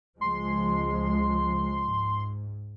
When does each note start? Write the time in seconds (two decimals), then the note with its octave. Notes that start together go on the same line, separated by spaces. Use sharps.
0.21 C#2 F3 G#3 C6
1.83 G#2